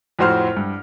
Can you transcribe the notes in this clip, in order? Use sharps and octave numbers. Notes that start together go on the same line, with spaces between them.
F2 A2 F#4 C5 C6 F6
G2